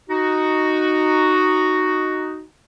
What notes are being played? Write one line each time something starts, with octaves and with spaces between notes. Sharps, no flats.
D#4 F#4